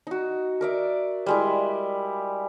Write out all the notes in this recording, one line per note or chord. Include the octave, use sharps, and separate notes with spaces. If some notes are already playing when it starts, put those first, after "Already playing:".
D#4 F#4
A#4 D5 E5
G3 G#3 E4